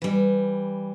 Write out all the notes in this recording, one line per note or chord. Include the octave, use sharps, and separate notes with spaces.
E3 G3